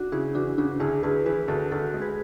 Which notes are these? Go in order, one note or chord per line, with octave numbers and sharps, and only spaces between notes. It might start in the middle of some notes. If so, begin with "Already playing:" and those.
Already playing: D4 F#4
C#3 E4 G#4
E3 D4 F#4
C#3 D4 F#4
D2 E4 G#4
D2 G#4 B4
E3 G#4 B4
D2 F#4 A4
D2 F#4 A4
G#3
G#4 B4